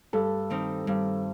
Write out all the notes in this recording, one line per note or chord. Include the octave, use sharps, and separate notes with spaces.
G2 A4
D#3 G3 C4 D#4
G2